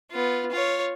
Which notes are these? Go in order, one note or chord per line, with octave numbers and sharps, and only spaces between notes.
B3 F4
F4 C#5